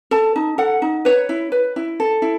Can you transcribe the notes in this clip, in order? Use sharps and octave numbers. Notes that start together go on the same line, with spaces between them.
A4 A5
D#4
A4 F#5
D#4
B4 C#5
E4
B4
E4
A4
E4